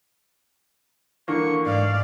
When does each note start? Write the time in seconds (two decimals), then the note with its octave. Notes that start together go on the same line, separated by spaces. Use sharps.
1.28 D3 E3 A#3 C#6
1.66 G#2 D5 F5